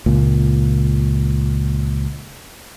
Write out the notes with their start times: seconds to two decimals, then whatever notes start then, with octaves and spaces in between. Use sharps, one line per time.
0.06 C#2 A#2